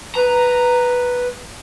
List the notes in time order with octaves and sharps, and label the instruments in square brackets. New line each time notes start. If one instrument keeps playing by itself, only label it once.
[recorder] B4 [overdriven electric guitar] A#5